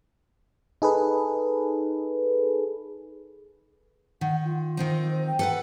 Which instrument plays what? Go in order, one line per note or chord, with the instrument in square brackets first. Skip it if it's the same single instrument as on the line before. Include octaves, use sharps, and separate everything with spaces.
[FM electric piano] D#4 G#4 A4 B4
[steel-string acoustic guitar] D#3 [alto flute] F#5
[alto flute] F4
[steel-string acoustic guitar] D#3 C4 D#4
[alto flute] C5
G5
[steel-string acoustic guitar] A4 B4 F#5